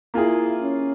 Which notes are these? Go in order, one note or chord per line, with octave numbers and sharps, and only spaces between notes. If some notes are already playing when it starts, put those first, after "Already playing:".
A#3 E4 F4 G#4
C#4